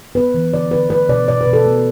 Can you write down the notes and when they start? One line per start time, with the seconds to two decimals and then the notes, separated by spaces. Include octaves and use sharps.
0.15 B3 B4
0.34 E3
0.53 D3 D5
0.71 D3 B4
0.90 A3 B4
1.09 B2 D5
1.28 B2 D5
1.41 B4
1.47 B2
1.53 A4
1.66 A3